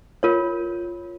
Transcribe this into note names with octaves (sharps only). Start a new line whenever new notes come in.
F4 A#4 C#5